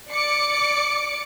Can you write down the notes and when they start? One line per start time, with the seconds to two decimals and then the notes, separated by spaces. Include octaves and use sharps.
0.11 D5 D6 C#7 D7